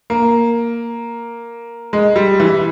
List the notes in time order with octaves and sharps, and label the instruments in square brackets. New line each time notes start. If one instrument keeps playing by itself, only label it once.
[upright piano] A#3
G#3
G3
E3